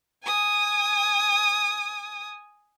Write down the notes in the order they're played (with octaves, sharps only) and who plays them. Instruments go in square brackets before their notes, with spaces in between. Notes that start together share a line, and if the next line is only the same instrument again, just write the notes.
[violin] G#5 D#6